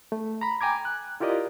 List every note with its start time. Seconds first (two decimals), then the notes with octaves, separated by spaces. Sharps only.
0.12 A3
0.41 A#5 B5
0.61 G5 G#5 A#5 D6 G#6
0.85 F#6
1.20 E4 F4 G4 A#4 D5 D#5